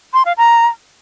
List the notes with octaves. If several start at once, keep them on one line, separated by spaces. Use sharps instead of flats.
C6
F5
A#5